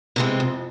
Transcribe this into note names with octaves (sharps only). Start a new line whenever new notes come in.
C3 E3 G#3 C4
F2